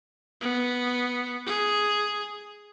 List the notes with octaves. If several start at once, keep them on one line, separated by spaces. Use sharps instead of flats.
B3
G#4